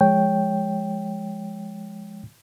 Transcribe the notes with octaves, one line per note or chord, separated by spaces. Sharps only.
F3 G#3 C#5 G5